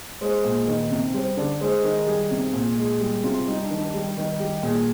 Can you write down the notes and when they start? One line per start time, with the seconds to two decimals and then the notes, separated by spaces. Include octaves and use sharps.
0.21 G#3 C5
0.45 A#2
0.67 D#3
0.91 C3
1.14 G3 C5
1.37 D3 D5
1.61 G#3 C5
1.84 D#3 A#4
2.07 G3 G#4
2.31 C3
2.54 A#2
2.77 G#3
3.01 G3
3.24 C3 F4
3.48 G3 D#4
3.63 D4
3.70 D#3
3.79 D4
3.94 G3
4.17 D#3
4.40 G3 G4
4.63 A#2 G#4